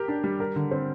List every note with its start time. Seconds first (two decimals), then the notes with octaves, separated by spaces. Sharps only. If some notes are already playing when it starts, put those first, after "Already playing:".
Already playing: G4 A#4
0.08 D4
0.24 G3
0.40 A#4
0.56 D3
0.71 C4